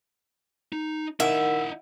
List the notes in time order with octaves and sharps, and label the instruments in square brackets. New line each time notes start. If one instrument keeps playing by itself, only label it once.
[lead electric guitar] D#4
[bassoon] D#3 [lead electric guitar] E4 D#5 [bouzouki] E5 [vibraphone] F#5